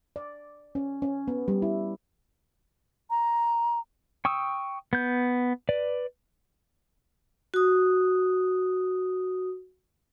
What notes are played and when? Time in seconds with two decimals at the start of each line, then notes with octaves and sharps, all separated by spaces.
0.16 D5
0.75 C#4
1.02 C#4
1.28 B3
1.48 G3
1.62 E4
3.10 A#5
4.25 G5 C#6 D#6 E6
4.93 B3 G6
5.69 B4 D5
7.54 F#4 D#6